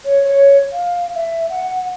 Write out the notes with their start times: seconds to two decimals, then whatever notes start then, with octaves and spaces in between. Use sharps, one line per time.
0.05 C#5
0.24 C#5
0.72 F5
1.14 E5
1.49 F#5